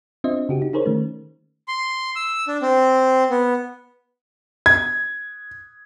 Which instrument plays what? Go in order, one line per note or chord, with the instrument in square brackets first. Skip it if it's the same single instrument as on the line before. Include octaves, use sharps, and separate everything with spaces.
[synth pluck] C4 D4 F4 C5 D#5 E5
C#3 F#4 G4
D#4
D#4 G#4 A#4 C5 C#5
D#3 A3 C#4
[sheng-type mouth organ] C6
E6
D4
C4
B3
[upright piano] G#6